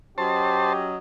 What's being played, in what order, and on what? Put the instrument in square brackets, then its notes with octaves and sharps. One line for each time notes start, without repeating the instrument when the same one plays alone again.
[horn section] F#3 C#4 D#5 [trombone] G4 [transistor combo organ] C5 A5